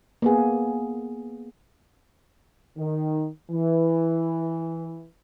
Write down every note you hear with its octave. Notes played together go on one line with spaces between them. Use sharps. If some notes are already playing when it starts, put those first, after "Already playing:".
A#3 B3 G#4
D#3
E3